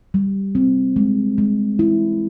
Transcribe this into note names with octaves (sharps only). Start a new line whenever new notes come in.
G3
C4
G#3
G#3
E4